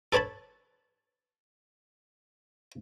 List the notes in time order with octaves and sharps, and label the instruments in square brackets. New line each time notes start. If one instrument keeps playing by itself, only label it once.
[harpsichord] A4 B4 C#5 A5 B5